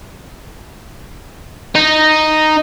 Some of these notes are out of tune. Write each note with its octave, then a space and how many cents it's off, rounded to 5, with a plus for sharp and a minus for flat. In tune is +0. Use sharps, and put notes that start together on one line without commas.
D#4 -5